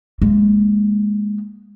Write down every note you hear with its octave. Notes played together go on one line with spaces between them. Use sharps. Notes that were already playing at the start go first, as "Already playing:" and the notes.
G#3 A#3